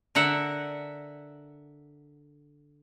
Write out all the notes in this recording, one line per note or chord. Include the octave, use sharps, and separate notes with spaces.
D3 A#4 E5 F#5